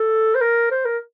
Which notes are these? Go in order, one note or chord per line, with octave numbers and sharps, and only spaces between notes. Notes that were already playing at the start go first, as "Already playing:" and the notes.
Already playing: A4
C5
A#4
C5
A#4